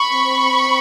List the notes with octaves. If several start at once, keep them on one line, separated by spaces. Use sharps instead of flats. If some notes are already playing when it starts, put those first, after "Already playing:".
Already playing: B5 C#6
C4